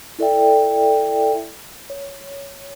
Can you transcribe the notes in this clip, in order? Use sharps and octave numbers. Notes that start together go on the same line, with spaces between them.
E4 A4 D5 E5 G5
C#5